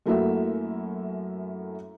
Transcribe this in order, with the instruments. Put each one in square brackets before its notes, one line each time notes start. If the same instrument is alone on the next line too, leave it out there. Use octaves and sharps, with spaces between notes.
[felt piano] F#2 A3 A#3 E4 F#4 E5